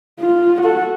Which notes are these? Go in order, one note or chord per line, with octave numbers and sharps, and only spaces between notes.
F4
F#4 A4